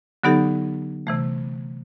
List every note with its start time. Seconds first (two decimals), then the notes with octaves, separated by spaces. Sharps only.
0.24 D3 F#3 B3 D#4 G4 A4
1.07 C3 E3 A3